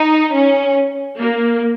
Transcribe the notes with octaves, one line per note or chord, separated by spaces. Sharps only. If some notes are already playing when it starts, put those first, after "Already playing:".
Already playing: D#4
C#4
A#3